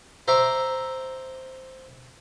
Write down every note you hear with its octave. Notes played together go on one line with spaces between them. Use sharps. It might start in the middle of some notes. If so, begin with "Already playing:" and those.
C5 E5 A#5 C#6 D6